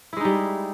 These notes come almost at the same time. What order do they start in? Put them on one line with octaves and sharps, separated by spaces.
E4 G#3 D#4 G3